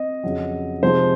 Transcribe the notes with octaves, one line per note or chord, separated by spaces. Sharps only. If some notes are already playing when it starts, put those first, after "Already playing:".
Already playing: C4 D#5
F2 C#3 F#3
C3 F3 G#3 D#4 C5